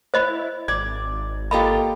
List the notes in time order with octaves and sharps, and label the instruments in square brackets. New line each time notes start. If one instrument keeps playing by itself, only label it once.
[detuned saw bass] E4 [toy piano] C5 D#5 B5
[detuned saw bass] G#1 [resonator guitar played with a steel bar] D5 [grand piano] G#6
[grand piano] A#3 G4 [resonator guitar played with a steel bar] F4 A4 D#5 [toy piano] B5